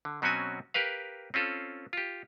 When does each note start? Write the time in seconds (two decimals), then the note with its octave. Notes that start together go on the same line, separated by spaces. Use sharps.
0.05 D3
0.22 B2 F#3 C4 C#4 F#4 G#5
0.74 G4 A#4 B4 F5
1.34 C4 C#4 F4 A4
1.93 F4 G4